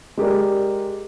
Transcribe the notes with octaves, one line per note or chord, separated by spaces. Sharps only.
G#3 G4 A#4 D5